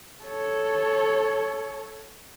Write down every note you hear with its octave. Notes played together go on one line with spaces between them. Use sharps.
A4 C#5